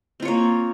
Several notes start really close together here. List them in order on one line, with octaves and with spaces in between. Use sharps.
C4 F4 C#5 A#3